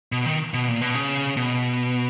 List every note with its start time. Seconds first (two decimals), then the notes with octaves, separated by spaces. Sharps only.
0.12 B2
0.26 D#3
0.54 B2
0.68 A#2
0.81 B2
0.95 C#3
1.37 B2